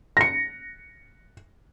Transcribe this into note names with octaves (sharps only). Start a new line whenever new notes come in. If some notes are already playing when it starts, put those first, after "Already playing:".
A#6 C#7